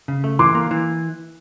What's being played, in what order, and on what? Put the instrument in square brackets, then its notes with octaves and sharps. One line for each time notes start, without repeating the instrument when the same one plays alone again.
[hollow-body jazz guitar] C#3
A3
[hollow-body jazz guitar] E3 [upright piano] C6 D6
[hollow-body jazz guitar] A#3
E3